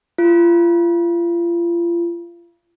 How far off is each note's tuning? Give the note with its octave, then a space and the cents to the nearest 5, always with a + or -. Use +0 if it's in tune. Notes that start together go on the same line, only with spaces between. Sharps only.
F4 -35